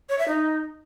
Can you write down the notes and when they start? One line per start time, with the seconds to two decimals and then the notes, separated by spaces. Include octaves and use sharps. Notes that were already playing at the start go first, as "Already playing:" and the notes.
0.09 C#5
0.19 E5
0.28 D#4